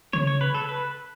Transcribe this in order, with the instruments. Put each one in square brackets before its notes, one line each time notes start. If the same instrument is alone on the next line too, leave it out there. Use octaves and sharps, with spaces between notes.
[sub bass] C#3 [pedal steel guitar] C#5
[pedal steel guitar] C#5
B4
A4
B4